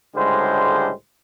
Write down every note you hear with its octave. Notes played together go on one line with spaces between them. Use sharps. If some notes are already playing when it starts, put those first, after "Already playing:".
C#2 A2 D3 G3 G#3 C5